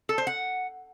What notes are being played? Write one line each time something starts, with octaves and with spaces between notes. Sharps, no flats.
A4
C5
F#5